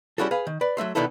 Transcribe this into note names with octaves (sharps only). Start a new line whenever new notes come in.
G3 C#4 E4 F#4 G#4 A4
G#4 B4 F5
D#3
B4 D5
F#3 A3 E5 C6
B2 D3 D#3 B3 E4 A4